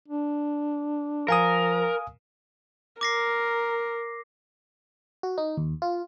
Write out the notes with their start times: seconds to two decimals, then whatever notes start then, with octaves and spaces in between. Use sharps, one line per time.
0.08 D4
1.28 F3 A#4 F5 G#5 D#6
3.01 A#4 D6 A#6 C7
5.23 F#4
5.38 D#4
5.57 D#2
5.82 F4